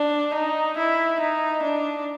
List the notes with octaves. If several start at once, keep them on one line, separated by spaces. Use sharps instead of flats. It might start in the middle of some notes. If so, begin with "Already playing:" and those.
Already playing: D4
D#4
E4
D#4
D4